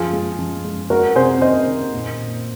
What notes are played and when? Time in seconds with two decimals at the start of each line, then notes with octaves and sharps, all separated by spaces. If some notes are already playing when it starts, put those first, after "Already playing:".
Already playing: F#2 F3 F4 G#4
0.13 G#3
0.39 F3
0.65 G#3
0.90 G#3 F#4 A#4
1.15 C3 G#4 C5
1.41 D#3 C5 D#5
1.67 D#3
1.93 A#2
2.19 A#2